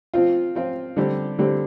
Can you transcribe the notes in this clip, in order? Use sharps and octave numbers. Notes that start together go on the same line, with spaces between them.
F3 C4 F4
F3 C4 F4
D3 G3 C4 G4
D3 G3 C4 G4